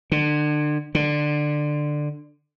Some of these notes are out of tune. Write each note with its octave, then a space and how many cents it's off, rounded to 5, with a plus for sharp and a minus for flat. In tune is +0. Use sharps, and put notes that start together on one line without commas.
D3 +30
D3 +15